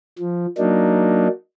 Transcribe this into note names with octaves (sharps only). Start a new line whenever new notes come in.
F3
F#3 A#3 D4 D#4